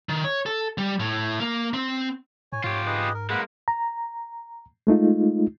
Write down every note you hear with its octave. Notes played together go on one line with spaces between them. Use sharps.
D#3
C#5
A4
G3
A2
A#3
C4
A2 C#5 G#5
G#2 F4 G4 C#5
G#4 B4 D#5
A#4
G#3 A#3 B4 F#5 B5
A#5
G#3 A3 D#4 F4